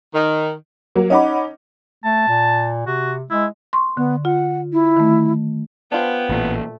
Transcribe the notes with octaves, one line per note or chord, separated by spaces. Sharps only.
D#3
F#3 A#3
C#4 D#4 D#5 F#5 B5 D6
A3 A5
A#2
C3 F#4
G#3 E4
C6 C#6
D3 B3
F4 F#5
E4
D#3 A3
B3 D4 F4 B4 C5 G5
A1 A#2 A3